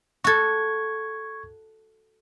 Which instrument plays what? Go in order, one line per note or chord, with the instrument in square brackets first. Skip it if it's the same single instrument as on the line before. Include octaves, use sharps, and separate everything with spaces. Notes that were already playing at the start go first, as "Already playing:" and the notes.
[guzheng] F#4 A4 [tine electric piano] C#6 G#6